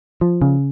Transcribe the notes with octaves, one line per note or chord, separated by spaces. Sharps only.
F3
C#3